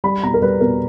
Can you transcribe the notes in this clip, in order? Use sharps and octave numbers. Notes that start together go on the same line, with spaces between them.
G3 B5
B2 A#5
A#4
G3 B4
B2 A#4